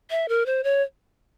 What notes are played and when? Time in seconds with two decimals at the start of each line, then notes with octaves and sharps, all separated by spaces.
0.10 E5
0.29 A#4
0.46 C5
0.64 C#5